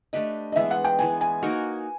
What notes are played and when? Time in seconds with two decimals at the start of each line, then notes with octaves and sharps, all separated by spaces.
0.13 A3 D4 G4 B4 D#5
0.52 D#5
0.56 E3 G#3 B3 E5
0.71 F#5
0.84 G5
0.99 E3 G#3 B3 G#5
1.21 G#5
1.42 A#3 D#4 F#4 A#4